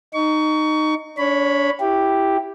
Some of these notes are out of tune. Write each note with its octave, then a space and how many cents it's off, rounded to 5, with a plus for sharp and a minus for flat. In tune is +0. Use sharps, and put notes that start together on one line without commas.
D#4 -15 C#6 +25
D4 -35 C#5 +0 B5 +0
E4 +0 G4 +0